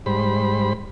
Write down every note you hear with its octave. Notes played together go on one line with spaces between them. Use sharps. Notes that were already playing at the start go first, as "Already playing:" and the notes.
G#2 G3 C5 B5